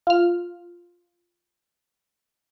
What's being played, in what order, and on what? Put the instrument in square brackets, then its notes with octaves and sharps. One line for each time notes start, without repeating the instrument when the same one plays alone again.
[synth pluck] F4 F6